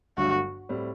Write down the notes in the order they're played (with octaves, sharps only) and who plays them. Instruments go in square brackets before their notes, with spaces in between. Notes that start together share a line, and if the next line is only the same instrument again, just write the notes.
[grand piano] G1 G2 D3 F#3 A3 [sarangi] F#4
[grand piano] A2 G3 C4